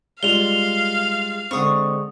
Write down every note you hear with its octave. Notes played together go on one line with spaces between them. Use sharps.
G3 G#3 F4 F5 F7 G7
D3 G#3 C4 C#6 D#6